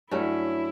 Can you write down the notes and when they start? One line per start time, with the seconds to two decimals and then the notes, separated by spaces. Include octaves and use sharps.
0.11 G2 F#3 A3 C#4 E4